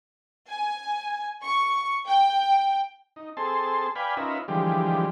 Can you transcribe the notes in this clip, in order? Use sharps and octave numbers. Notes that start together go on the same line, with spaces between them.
G#5
C#6
G5
D#4
C4 G#4 A4 A5 C6
B4 D5 F5 G5 G#5 B5
C#4 D#4 F4 A#4 B4 E5
D3 E3 F3 G3 G#3 G4